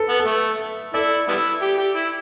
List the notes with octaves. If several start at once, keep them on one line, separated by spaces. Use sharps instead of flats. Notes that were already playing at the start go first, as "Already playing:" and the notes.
Already playing: A4 B4
B3
A4
A3
E4 A4 D5
G3 B3 E4
G4
G4
E4